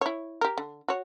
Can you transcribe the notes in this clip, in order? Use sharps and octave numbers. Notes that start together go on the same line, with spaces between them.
E4 C#5
G4 A#4
D3
F#4 C#5